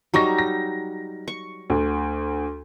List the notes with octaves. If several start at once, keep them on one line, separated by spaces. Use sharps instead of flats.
F#3 G3 D#4 A#5 C#6 A#6
A#6
C#6
D2